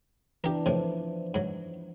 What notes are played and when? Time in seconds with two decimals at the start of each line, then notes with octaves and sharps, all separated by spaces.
0.44 E3 D4 G4 A#4
0.66 A2 C3 F3
1.34 G#2 F#3